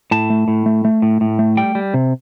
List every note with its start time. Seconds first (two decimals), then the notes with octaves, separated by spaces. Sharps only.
0.11 A2 A5
0.30 A3
0.48 A2
0.66 A3
0.85 A3
1.02 A2
1.21 A2
1.39 A3
1.57 G3 G5
1.75 G3
1.94 C3